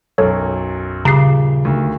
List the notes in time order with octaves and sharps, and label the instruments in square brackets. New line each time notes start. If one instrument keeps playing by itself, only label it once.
[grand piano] B1 F#2 [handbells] A4 C#5
[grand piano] D#1 G4 [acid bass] C#3 [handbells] A#5 C7
[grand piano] D2 D#3